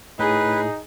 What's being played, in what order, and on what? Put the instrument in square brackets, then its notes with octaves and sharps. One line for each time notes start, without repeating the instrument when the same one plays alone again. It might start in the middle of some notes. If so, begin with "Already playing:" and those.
[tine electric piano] A2 [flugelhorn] D#4 [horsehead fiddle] G#4 [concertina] B4